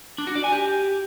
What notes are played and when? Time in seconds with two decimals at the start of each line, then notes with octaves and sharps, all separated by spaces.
0.18 D4
0.27 F#4
0.35 D5
0.44 G#5
0.52 G4